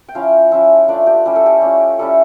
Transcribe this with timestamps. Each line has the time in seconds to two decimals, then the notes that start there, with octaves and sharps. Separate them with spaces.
0.08 G5
0.15 F3 C#4 E4 F5
0.51 F3 C#4 E4 E5
0.88 A3 D4 F4 D5
1.07 G4
1.25 G3 C#4 E4 G4
1.36 A4
1.46 G4
1.62 A3 C#4 F4
1.99 G3 C#4 E4 A4